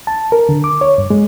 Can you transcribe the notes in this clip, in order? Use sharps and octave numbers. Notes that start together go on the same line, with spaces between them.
A5
A#4
D3
D6
C#5
G2
G#3